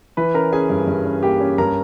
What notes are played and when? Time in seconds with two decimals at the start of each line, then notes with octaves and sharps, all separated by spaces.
0.17 E3 B4 B5
0.34 C#4 A#4 A#5
0.52 C#4 G#4 G#5
0.70 G2
0.87 G2
1.05 C#4
1.23 A#3 G4 G5
1.41 C#4
1.58 G2 A#4 A#5